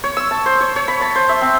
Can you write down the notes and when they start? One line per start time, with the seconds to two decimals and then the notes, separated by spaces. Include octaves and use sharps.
0.04 C#5
0.17 E6
0.31 A5
0.46 C5
0.61 C#5
0.76 C#5
0.88 B5
1.01 A5
1.16 C5
1.29 E5
1.41 C4